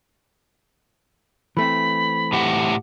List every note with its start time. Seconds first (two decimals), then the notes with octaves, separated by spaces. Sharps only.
1.57 E3 A3 C4 B5
2.33 A2 G4 F#5